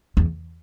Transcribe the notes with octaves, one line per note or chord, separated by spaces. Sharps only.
E2